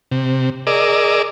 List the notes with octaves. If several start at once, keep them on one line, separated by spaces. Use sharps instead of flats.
C3
G#4 A#4 D5 D#5 D6 E6